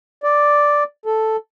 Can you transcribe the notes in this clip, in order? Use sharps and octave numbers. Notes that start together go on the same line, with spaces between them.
D5
A4